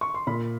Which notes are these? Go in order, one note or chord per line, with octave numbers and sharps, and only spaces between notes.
C#6
C6
A#2 B5